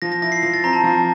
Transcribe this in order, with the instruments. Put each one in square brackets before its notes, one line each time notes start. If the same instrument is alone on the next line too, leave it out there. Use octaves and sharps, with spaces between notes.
[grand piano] F3 [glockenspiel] A#6
[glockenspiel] A#6
[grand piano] E4 [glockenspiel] A#6
[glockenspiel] C7
[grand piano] F3 [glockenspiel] A#6
[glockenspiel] A6
[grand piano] C4 [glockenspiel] A#5
[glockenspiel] A5
[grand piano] F3